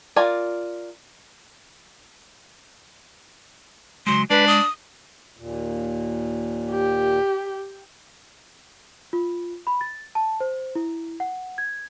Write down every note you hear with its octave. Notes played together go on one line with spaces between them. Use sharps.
F4 A#4 D5 G#5
C#3 F#3 G#3 C6
G#3 D4 B4
D#6
D#2 A#2
G4
F4
B5
A6
A5
C5
E4
F#5
G#6